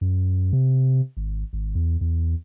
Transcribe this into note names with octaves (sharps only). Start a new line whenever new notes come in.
F#2
C3
G#1
G#1
E2
E2